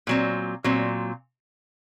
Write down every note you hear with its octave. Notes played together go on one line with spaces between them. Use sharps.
A#2 F#3 C4
A#2 F#3 C4